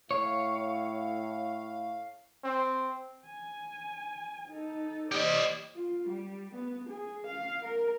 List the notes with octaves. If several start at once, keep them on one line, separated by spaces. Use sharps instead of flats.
A2 C#5 F5
C4
G#5
D#4 A4
G4 C5 D5 D#5
F4
G3
B3
G#4
F5
A#4